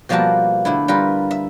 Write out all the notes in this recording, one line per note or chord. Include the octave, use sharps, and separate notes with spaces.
B2 F3 G3 A#3 F#4 A5
D3 A3 E4
G3 F4 A#4 B4
E5